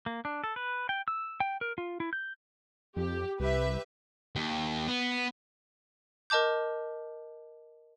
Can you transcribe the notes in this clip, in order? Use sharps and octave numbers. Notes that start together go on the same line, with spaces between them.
A#3
D4
A4
B4
G5
E6
G5
A#4
F4
E4
G6
F2 G4
C2 G4 B4 E5
D#2
B3
A#4 D#5 A5 D6 G6